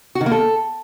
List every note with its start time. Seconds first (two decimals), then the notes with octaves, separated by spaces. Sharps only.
0.15 F#4
0.21 D#3
0.26 A#3
0.31 A4